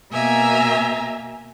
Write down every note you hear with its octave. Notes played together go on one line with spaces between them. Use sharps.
B2 A#3 E5 G#5 A#5